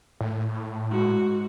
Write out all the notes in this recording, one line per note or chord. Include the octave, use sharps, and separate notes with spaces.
A2
G#2 F#4